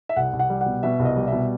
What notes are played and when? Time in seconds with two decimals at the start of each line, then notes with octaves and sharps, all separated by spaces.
0.09 E5
0.16 C2 F#5
0.33 C2
0.39 F#5
0.50 G3
0.61 B2 F#5
0.83 B2 E5
0.99 C2
1.05 D#5
1.16 G3
1.27 B2 E5